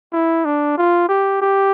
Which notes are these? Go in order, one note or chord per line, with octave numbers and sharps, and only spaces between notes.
E4
D4
F4
G4
G4